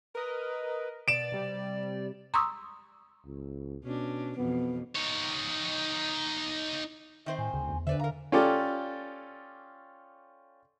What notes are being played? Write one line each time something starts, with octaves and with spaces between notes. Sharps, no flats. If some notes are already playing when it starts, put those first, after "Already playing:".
A#4 B4 D#5
B2 D5 A6 D7 E7
C3 G3
A#5 C6 C#6 D#6 E6
C#2
B2 C#4 D4
F2 B2 E3 B3
D#4 C#5
D#3 C4 C5 E5
A2 G#5
D2 C#3
E2
D3 B4 C5 D5 E5
A#4 F5 A#5
C#4 F4 G4 A4 D5